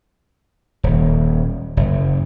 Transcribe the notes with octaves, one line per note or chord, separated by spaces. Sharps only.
D#1
F#1